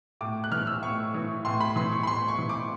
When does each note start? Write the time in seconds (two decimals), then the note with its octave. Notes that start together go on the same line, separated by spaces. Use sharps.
0.21 A2 D6
0.44 F#6
0.52 E3 F6
0.67 E6
0.82 A2 C#6
1.14 E3
1.45 A2 C6
1.60 B5
1.76 E3 C6
1.92 C#6
2.03 B5
2.07 A2 C6
2.28 C#6
2.38 E3
2.49 D6